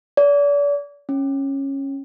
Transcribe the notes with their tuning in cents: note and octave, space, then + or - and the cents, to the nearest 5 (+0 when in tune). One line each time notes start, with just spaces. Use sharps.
D5 -40
C#4 -15